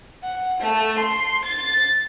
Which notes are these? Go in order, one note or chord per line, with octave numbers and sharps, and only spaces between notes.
F#5
A3
C6
A6